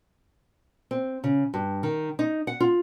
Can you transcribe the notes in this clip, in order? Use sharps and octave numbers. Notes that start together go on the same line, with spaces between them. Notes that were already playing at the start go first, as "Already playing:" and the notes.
C4
C#3
G2
D#3
D#4
F#5
F4